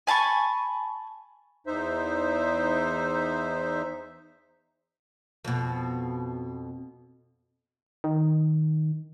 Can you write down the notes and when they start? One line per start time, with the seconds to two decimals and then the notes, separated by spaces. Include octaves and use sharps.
0.07 G#5 A5 B5 C#6
1.67 E2 D#4 C5 E5
5.45 F2 B2
8.04 D#3